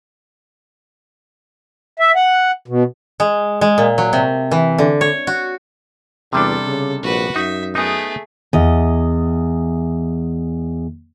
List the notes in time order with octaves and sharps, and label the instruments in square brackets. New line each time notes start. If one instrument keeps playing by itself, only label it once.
[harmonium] E5
F#5
B2
[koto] G#3
G#3
A#2
F#3
C3
E3
D3
C#5
F#4
[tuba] E2 [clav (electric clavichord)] C3 G3 D4 [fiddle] A4
[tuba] C#3
[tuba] A#1 [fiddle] F#4 B4
[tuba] F#2 [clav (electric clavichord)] D#4 [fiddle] E5
[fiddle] A3 G#4 [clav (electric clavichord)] B3 D#4
[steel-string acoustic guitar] E2 D#5